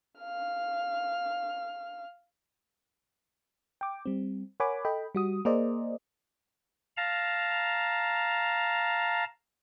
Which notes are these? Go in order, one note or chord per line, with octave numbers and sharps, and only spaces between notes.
F5 F6
G5 D6
G3 C4
A#4 C#5 F#5 G#5 B5 D6
A4 D#5 G5 B5
G3 F#4 D#6
A#3 G#4 A#4 C5 D5 D#5
F5 A5 A#5